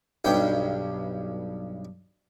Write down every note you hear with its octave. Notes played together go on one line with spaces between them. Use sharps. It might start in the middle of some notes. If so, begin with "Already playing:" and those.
B1 G2 G5